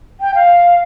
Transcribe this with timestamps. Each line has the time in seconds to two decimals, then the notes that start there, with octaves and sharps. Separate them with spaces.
0.20 G5
0.35 F5